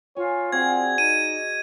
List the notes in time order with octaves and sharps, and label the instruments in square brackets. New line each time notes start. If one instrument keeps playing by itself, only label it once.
[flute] F4 [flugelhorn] C#5 [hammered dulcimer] G#5
[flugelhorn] C4 [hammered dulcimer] F#4 G#4 D5 [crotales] G#6
[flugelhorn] D#4 [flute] D#5 [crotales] D#7